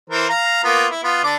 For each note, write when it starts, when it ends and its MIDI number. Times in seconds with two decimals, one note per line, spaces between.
0.10 0.26 52
0.10 0.26 70
0.10 0.26 72
0.29 0.64 77
0.29 0.64 82
0.64 0.86 58
0.64 0.86 59
0.64 0.86 65
0.91 1.01 64
1.04 1.23 59
1.04 1.23 65
1.24 1.36 50
1.24 1.36 62
1.24 1.36 86